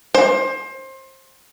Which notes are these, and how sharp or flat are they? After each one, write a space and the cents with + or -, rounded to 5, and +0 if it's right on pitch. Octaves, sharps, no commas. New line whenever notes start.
C5 +25